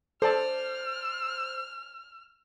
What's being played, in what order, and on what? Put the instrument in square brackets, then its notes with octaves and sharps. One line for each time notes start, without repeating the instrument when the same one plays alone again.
[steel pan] A4 A5 [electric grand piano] C5 D5 [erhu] F6